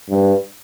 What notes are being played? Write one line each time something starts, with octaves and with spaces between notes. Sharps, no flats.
G2